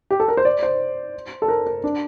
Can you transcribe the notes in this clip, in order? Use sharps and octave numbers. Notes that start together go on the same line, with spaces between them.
G4
A4
A#4
C5
D5
C5
A4
A#4
A#4
D4